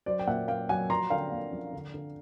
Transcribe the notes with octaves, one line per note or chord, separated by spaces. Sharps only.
F#3 C5 D5
G5
A#2 E5 F#5
F#3 F5 G5
F#3 F#5 G#5
F3 A#5 C6
D3 F5 G5
A#3
F3
D3
D3